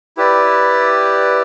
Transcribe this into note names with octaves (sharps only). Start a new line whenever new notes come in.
E4 G4 B4 D5